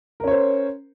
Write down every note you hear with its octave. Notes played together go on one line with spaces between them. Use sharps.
C#4 A#4 C5 C#5